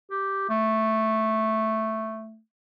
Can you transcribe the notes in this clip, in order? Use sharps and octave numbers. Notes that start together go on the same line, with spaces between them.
G4
A3